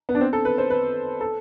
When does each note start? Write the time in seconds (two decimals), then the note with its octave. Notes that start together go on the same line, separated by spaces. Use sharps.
0.09 B3
0.15 D4
0.21 C4
0.33 A4
0.45 B4
0.58 C5
0.70 B4
1.21 A4